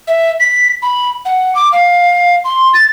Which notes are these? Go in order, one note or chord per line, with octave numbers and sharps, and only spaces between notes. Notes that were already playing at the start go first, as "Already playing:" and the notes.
E5
B6
B5
F#5
D6
F5
C6
A6